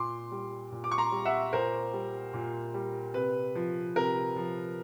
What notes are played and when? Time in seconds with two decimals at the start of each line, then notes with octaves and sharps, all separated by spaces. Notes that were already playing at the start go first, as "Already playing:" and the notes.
Already playing: A#2 C6 D6
0.31 G3
0.72 A#2
0.84 D6
0.91 C#6
0.98 A#5 C6
1.12 G3
1.25 E5 F#5
1.53 A#2 A#4 C5
1.93 G3
2.34 A#2
2.74 G3
3.14 C3 B4
3.55 F3
3.95 C3 A#4
4.36 F3